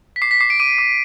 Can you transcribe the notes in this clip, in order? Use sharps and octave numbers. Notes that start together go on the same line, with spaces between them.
B6
D6 C7
B6
D6 C7
D7
D6 D#7
D6